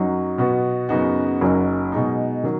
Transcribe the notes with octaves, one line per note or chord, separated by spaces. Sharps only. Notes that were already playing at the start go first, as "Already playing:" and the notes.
Already playing: F#2 F#3 D#4 F#4
B2 B3 F#4
F#2 C#3 B3 D#4 F#4
F#1 F#2 F#3 D#4
B2 G#3 D#4
D#3 F#3